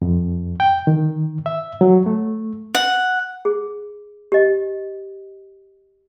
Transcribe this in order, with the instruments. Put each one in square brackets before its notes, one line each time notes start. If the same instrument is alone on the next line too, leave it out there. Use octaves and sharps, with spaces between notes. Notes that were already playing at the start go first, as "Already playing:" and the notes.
[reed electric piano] F2
G5
D#3
E5
F#3
A3
[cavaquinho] F#5
[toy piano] G#4
G4 D#5